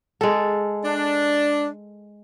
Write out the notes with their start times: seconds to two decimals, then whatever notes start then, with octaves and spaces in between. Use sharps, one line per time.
0.21 G#3 A4
0.85 D4